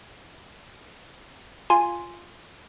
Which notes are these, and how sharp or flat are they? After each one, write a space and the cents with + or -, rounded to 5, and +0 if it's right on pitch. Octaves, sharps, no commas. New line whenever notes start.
F4 -5 G#5 +0 C6 +0